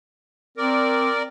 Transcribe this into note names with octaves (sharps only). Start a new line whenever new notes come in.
C4 A#4 D5